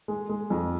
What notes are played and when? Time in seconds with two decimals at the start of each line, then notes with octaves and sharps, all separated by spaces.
0.08 G#3
0.29 G#3
0.50 F2